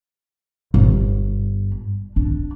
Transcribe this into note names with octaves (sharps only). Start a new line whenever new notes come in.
G1
D4